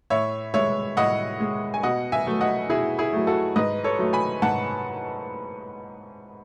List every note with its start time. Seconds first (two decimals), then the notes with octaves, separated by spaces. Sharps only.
0.10 A2 C#5 E5
0.54 G#3 C#5 E5
0.97 A2 D#5 F#5
1.40 G#3
1.74 G#5
1.83 B2 D#5 F#5
2.12 E5 G#5
2.27 F#3 A3
2.41 D#5 F#5
2.69 B2 E4 G#4
2.99 E4 G#4
3.13 F#3 A3
3.27 F#4 A4
3.56 G#2 B4 D#5
3.84 A4 C#5
3.99 F#3 A3
4.13 G#5 B5
4.42 G#2 F#5 A5